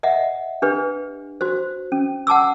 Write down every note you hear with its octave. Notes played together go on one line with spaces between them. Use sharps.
D#5 E5 F#5
D4 G4 B4
F#4 C5
C#4
F#5 A5 D6 E6